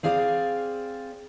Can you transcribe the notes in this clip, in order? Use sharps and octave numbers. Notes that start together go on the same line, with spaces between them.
C4 G#4 D5 F5